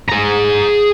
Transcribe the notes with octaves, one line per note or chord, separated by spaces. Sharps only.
G#4 A#5